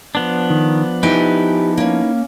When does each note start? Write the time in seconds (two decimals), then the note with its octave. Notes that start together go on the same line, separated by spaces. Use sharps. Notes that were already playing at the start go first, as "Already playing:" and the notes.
0.15 F3 B3 D4
0.50 D#3
1.03 D#4 E4 G4 B4 G#5
1.77 A#3 C#4